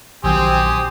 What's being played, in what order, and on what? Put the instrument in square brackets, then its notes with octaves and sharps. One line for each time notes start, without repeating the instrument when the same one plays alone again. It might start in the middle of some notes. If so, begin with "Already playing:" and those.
[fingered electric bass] A#1 D#3 F#3 [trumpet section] C4 [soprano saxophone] G4 [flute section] C5 G#5 D#6